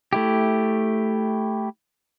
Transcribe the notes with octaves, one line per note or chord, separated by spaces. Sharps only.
A3 E4 G4